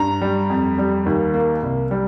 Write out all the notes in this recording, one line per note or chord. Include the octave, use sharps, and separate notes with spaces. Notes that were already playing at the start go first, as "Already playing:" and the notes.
Already playing: G2 A#5
G3
F2
G3
D#2
A#3
C2
G3